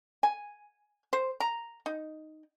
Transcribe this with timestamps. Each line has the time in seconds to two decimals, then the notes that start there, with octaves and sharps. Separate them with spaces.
0.23 G#5
1.13 C5
1.40 A#5
1.86 D#4